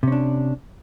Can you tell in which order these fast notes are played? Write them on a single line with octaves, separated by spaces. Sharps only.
C3 C#4 D4